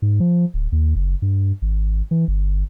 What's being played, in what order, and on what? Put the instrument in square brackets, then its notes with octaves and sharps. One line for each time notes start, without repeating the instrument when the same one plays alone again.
[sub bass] G#2
F3
D1
D#2
F#1
G2
G#1
E3
G1